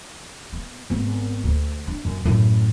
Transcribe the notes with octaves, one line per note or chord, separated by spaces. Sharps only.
B3
G#1 B3
D2
D4
F#2
F#2 A2